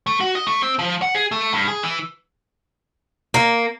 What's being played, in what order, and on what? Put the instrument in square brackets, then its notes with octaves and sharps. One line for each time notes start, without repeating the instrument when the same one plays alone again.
[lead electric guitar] A3
F#4
D#5
A3
C4
F3
F#5
G#4
A3
G2
G#4
E3
[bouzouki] A#3